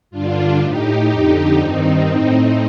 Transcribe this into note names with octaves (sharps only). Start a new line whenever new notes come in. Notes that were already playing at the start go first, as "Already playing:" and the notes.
G2 D3 D4 F4
A2 D#4 G4
F2 D3 D#4 G4
G2 D#3 C4 D#4
A2